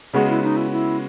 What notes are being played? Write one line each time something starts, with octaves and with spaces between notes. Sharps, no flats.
C#3 G#3 B3 F#4 G#4
E4
D#4
E4
E4